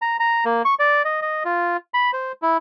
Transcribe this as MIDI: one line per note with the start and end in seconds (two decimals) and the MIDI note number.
0.02 0.17 82
0.20 0.44 82
0.45 0.62 58
0.65 0.75 85
0.79 1.02 74
1.05 1.20 75
1.22 1.43 75
1.45 1.77 65
1.94 2.11 83
2.13 2.32 72
2.42 2.57 64